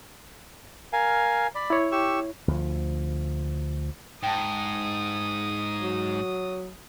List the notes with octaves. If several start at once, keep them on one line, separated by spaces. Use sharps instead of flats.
A#4 F5 G#5
D5 B5
E4 C#5
G4 C#6 E6
D2 F3
G#2 G5 A5 D#6
F#3